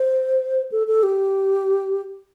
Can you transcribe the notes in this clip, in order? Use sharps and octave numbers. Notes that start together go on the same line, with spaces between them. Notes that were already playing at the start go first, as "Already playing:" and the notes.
Already playing: C5
A4
A4
G4